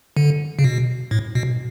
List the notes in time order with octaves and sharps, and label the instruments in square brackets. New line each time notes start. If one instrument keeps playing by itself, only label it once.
[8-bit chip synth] D3
C#3
B2
A2
B2